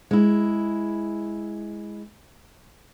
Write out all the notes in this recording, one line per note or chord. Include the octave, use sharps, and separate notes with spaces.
G#3 E4